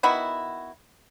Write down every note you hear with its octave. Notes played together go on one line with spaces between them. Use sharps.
D#3 B3 E4 F#4